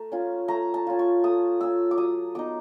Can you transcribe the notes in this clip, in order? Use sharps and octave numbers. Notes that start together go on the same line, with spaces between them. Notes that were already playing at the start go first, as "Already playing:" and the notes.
Already playing: A3 A#5
C#4 F4
A3 A#5
A5
C#4 F4
C#6
A3 D#6
C#4 F4 E6
D6
F#3 D#6
B3 D#4 D6